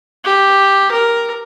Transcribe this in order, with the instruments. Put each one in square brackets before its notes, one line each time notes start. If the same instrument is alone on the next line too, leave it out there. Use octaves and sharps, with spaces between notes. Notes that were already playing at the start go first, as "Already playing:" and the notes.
[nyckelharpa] G4
A#4